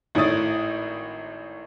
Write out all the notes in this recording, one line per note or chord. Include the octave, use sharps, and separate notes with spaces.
G#1 A2 E4 C#5 D#6 A6